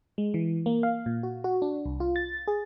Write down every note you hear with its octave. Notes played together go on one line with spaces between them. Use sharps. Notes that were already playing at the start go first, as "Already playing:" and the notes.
G#3
E3
A#3
F5
A#2
F#4
F#4
D4
C2
F4
A6
G#4